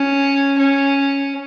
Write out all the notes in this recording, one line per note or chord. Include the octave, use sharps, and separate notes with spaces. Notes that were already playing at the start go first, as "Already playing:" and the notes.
Already playing: C#4
C#4